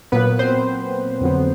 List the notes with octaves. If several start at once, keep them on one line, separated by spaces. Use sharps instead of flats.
A#2 F#3 A#3 B3 B4
C4 C5
F2 D3 F#3 B3